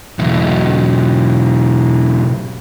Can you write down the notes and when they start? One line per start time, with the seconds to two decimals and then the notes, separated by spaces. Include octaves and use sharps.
0.19 B1 E2